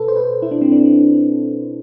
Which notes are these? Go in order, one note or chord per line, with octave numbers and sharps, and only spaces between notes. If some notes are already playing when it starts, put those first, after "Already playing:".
Already playing: B2 A4 B4
C5
B4
E4
D4
C4
D4